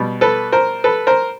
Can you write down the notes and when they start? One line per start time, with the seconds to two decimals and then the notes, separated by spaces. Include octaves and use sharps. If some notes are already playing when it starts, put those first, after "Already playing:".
Already playing: B2 G3
0.21 A4 B4
0.52 A#4 C5
0.84 A4 B4
1.07 A#4 C5